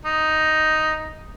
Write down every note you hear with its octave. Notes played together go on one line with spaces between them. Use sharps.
D#4